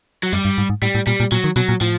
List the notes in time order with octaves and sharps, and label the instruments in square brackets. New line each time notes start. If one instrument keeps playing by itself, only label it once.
[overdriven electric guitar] F#3
[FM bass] F#2 [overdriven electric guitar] G3
[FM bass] G2
G#2
G#2
[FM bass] A2 [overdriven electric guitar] G3
[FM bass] A2
[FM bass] A#2 [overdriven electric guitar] G3
[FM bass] A#2
[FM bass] A#2 [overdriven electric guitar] F#3
[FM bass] D#3
[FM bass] B2 [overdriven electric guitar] F#3
[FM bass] A#2
[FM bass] A2 [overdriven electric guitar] F3